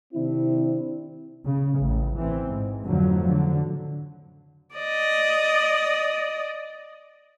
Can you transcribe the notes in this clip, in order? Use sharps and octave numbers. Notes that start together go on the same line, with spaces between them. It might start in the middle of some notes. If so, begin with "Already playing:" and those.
C3 D#3 C4 D4 E4
C#3
A1
E3 C4
G#2
F2 A2 D3 F3 F#3
D3
D5 D#5